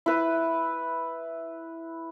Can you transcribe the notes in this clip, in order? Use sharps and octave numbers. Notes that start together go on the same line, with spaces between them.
E4 B4